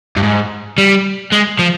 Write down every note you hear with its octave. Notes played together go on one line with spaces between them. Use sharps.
G2
G#2
G3
G#3
F3